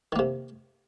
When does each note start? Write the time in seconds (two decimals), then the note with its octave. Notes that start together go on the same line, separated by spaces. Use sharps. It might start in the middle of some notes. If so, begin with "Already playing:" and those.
0.12 D#3
0.16 A#3
0.19 C3